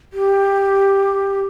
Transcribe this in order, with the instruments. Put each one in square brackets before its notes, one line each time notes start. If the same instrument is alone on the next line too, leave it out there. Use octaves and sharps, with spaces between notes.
[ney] G4